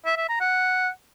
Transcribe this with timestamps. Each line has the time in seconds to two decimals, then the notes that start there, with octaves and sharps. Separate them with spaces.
0.06 E5
0.17 E5
0.29 A#5
0.41 F#5